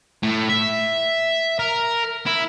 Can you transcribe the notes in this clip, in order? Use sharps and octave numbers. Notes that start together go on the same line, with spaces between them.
A2
E5
A#4
E4